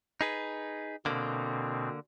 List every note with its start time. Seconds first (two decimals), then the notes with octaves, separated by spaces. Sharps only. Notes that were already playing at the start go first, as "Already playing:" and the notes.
0.21 D#4 G#4 B4
1.06 B2 D3 A#3 C4